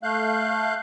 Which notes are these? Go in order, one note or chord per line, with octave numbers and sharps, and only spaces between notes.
A3 F5 F#6 G6